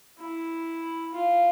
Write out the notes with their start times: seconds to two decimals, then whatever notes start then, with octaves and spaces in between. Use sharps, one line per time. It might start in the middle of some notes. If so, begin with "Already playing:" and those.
0.19 E4
1.13 F4